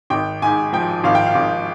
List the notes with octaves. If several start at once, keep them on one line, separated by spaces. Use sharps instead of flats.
G#1 G5
G#2 G#5
F3 G5
G#1 F5
G5
F5
G#1